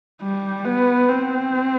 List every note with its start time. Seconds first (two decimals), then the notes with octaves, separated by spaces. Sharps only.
0.22 G3
0.65 B3
1.08 C4